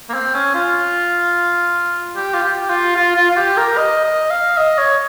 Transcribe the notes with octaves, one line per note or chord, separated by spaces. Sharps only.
A#3
C4
C#4
F4
G4
F4
G4
F4
F4
F4
F4
G4
A#4
D#5
D#5
F5
D#5
C#5